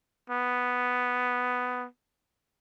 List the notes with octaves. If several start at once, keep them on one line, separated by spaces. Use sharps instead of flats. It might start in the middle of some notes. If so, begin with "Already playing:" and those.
B3